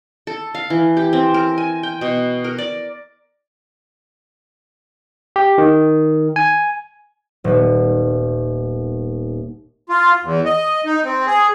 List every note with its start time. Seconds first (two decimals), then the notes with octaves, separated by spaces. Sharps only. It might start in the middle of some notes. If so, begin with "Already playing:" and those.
0.27 A4
0.55 F5
0.70 E3
0.97 G4
1.13 C4
1.34 A#4
1.58 G#5
1.83 G5
2.01 B2
2.44 A#4
2.58 D5
5.36 G4
5.58 D#3
6.36 G#5
7.44 D#1 B3
9.89 F4
10.23 E2
10.45 D#5
10.86 D#4
11.04 C4
11.27 G#4